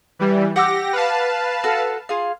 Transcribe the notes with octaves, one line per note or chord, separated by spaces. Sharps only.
E3 G3
G4 F#5 D6 E6 A#6
B4 F5 A5
F#4 A4
F4 G#4 F5